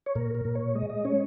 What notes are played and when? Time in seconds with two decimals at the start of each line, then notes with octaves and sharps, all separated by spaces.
0.06 C#5
0.15 A#2 A#4
0.35 A#4
0.45 A#2
0.55 C#5
0.75 G#3 D#5
0.90 D#5
1.05 C#4 C#5